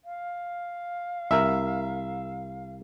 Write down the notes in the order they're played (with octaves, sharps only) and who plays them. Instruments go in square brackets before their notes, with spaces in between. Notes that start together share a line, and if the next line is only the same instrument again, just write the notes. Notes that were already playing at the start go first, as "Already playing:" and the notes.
[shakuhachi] F5
[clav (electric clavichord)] C2 A#4 [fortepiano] E5